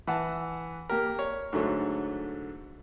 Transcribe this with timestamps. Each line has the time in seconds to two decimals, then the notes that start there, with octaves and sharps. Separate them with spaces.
0.07 E3 F#5 A5
0.89 A#3 G4 A#4
1.19 C#5
1.53 G#2 D3 F#3 A3